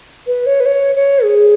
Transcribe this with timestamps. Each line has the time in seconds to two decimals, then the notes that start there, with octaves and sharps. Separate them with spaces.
0.27 B4
0.46 C#5
0.60 B4
0.66 C#5
0.95 C#5
1.24 G#4